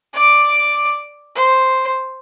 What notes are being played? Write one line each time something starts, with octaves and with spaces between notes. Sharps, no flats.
D5 D6
C5